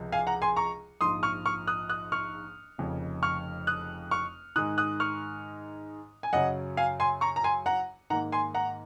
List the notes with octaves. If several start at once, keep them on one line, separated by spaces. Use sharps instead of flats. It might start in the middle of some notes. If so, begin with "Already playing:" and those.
Already playing: C#2 C3 F3
F5 G#5
F#5 A#5
G#5 C6
A#5 C#6
A#1 G#2 F3 C6 D#6
C#6 F6
C#6 F6
D#6 F#6
D#6 F#6
C#6 F6
F1 F2 C#3
C#6 F6
D#6 F#6
C#6 F6
G#2 D#3 G#3 D#4 D#6 F#6
D#6 F#6
C#6 F6
G#5
F#2 C#3 F#3 C#4 D#5 F#5
F5 G#5
G#5 C6
A#5 C#6
A#5
G#5 C6
F#5 A#5
G#2 D#3 A#3 F#5 A#5
G#5 C6
F#5 A#5